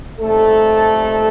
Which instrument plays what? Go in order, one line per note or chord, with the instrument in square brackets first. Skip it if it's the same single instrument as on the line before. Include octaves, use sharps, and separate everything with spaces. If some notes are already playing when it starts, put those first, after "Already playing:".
[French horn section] A#2 G3 A3 C4 D#4 A4